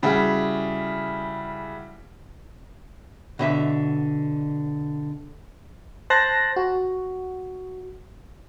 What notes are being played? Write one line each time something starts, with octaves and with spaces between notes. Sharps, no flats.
C#3 G3 E4 F#4 G#4
B2 D3 E5
C5 A5 C6 F#6 A#6
F#4